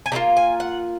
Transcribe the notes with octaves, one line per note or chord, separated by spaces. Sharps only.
G#5
C3 F#3 A#3 F4 A#5
G#5
F#5